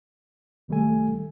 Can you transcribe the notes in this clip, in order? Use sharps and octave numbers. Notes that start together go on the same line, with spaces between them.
C2 D#3 G3 A3 A4 G#5